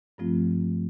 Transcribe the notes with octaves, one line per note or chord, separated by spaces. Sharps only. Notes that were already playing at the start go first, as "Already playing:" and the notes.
G2 F3 A3 C4 F4